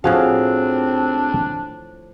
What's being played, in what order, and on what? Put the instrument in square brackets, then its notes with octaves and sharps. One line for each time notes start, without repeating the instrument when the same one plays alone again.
[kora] A2 F3 F5 [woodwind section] C4 [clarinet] D4 [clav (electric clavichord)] F#4 G#4